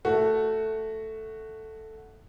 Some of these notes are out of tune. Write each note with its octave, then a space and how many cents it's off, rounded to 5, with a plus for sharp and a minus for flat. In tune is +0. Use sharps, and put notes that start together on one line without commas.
A3 +0 F#4 +0